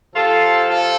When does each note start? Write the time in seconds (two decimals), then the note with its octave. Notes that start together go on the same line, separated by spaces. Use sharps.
0.14 C3 F3 F4 A4
0.67 F4 A4